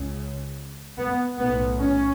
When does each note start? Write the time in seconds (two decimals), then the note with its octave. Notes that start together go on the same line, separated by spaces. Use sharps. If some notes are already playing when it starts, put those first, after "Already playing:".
Already playing: C#2 C#3
0.98 B3
1.38 B1 A2 B3
1.80 C#4